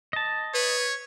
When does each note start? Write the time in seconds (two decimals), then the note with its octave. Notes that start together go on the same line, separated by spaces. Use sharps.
0.13 D#5 A5
0.54 B4 C#5